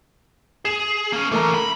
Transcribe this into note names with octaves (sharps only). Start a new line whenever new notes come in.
G#4 E7
A#3 C#4
E3 A3 A#3 C#4 A#5
B5